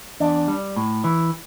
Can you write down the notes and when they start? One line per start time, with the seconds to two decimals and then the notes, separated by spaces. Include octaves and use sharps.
0.20 E2 D4
0.48 G3
0.76 A2
1.04 E3